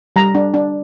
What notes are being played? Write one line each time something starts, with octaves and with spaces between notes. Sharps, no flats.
G3 A#5
D4
D4